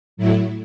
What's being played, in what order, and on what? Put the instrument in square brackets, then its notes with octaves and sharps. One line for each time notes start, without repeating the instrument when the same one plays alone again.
[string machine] A2 F#3 A3 E4